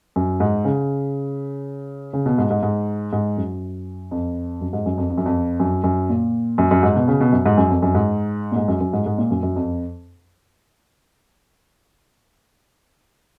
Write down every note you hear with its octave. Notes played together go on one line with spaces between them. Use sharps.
F#2
G#2
C#3
C#3
B2
G#2
G#2
G#2
G#2
F#2
F2
F#2
G#2
F#2
F2
F2
F#2
F2
F#2
F#2
A#2
F#2
F#2
G#2
B2
C#3
B2
F#2
G#2
F#2
F2
F#2
G#2
A#2
G#2
F#2
F#2
G#2
G#2
A#2
F#2
F#2
F2